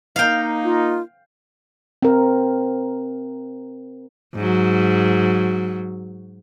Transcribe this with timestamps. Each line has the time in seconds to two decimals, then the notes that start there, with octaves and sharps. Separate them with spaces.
0.16 A#3 D#4 F5 G5
0.64 F4
2.02 C4 A#4
4.35 G#2 F#3